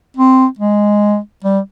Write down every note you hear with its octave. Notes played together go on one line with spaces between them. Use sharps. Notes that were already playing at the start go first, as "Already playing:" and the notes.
C4
G#3
G3